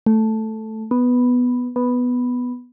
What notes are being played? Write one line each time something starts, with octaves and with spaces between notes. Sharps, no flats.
A3
B3
B3